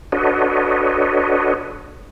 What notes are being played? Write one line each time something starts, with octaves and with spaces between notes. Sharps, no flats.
D4 F#4 A4 B4 C#5 D#5